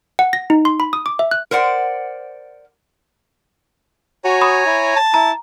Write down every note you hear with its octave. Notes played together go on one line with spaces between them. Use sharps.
F#5
A#6
D#4
C6
B5
D#6
D6
E5
F#6
A#4 C5 D5 F#5
F#4 C#5 G#5 A#5
B5 D#6
E4
A5
E4 A#5